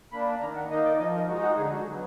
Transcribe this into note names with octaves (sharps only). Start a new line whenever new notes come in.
A#3 D4 B5
D#3 A#5
F#5
A#3 D#4 D#5
D5
F3 D#5
A#4
G#3 D#4 F#4
F#4
D3 G#4
F#4
F#3 B3